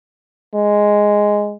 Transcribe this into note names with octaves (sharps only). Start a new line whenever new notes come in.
G#3